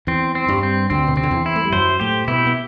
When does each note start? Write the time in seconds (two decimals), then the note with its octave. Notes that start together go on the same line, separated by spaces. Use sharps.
0.07 E2 E3 C4
0.35 C4
0.48 G2 G3
0.63 C4
0.90 D2 D3 C4
1.07 B2
1.16 C3 C4
1.23 D3
1.31 E2 E3
1.46 E4
1.56 A3
1.65 G3
1.72 F#2 F#3 C5
2.00 A2 A3 G4
2.28 B2 B3 E4
2.47 B3